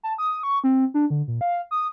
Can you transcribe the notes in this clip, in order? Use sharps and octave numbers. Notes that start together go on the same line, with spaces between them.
A5
D#6
C#6
C4
D4
D3
A#2
F5
D#6